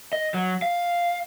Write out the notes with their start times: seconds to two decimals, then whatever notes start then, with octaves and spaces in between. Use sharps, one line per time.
0.13 D#5
0.34 F#3
0.62 F5